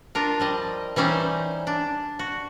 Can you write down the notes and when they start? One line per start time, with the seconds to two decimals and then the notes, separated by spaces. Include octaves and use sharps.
0.15 D4 F4 A#4
0.39 F3 G3 D#5
0.96 E3 G3 C#4 D#4 C5
1.67 D4
2.19 F#4